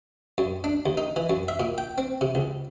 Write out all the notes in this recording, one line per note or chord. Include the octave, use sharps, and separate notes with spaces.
F#2
D4
D#2
D#4
E3
F#2
E5
A#2
G5
C4
C3
C#2